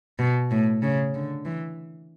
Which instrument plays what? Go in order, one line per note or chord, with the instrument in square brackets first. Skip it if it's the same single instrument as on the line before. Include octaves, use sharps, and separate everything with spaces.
[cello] B2
A2
C#3
D3
E3